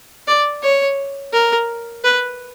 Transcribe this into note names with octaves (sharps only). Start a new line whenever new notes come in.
D5
C#5
A#4
B4